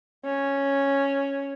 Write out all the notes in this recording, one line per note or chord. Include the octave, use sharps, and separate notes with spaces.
C#4